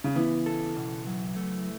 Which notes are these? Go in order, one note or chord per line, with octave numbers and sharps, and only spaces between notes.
C#3
E3 B3
A4
B2
F#3
A3